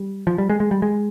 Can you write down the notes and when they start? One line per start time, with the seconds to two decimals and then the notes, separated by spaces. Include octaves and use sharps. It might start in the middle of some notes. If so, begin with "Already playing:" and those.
Already playing: G3
0.27 F3
0.38 G3
0.50 G#3
0.60 G#3
0.71 G3
0.82 G#3